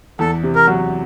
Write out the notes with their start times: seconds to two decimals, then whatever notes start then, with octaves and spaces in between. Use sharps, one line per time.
0.19 E2 A4
0.43 C3
0.55 A#4
0.67 F#3